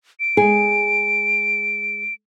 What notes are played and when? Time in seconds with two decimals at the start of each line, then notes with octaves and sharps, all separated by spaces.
0.20 D7
0.37 G#3 G#4